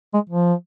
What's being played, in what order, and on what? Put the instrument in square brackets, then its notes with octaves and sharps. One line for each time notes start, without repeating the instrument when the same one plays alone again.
[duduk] G#3
F3